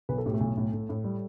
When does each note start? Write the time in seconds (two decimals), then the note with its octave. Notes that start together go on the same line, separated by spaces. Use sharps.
0.09 B1 B4
0.18 A4
0.26 A2 G4
0.34 A3 A4
0.41 B1
0.57 A2
0.73 A2
0.89 A2
1.04 G3